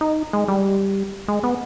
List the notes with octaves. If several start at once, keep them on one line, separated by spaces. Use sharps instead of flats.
D#4
G#3
G3
G#3
B3